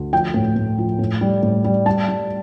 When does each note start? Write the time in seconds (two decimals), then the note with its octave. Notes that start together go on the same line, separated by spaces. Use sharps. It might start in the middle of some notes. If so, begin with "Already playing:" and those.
Already playing: D2
0.13 F3 G5
0.34 A2
0.56 A2
0.78 F3
0.99 A2
1.21 G3
1.43 A2
1.64 G3
1.86 G3 A5
2.08 G3